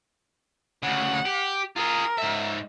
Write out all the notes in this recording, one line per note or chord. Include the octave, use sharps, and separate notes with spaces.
D2 C#3 F#5
G4
F4 G#4 A#4
G#2 E5